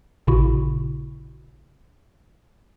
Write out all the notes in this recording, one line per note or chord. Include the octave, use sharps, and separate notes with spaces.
A1 A#2 C#3 E4 F#4